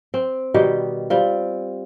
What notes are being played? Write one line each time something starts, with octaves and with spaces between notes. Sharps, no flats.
C4
B2 D#3 G3 G4
G3 C4 F4